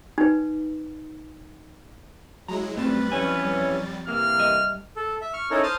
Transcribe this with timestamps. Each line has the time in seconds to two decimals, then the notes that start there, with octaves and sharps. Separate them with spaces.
0.18 D#4 B4
2.48 F#3 G#3 E4 A#5
2.77 F#2 G3 A3 C4 B4 A6
3.12 F2 E3 C#4 G#5
4.07 C3 E3 A#3 F6
4.39 G2 D#5 E5
4.96 A4
5.21 E5
5.33 C#6 F6
5.51 C#4 D#4 E4 A4 A#4 C#5
5.63 C5 A5 D#6 F6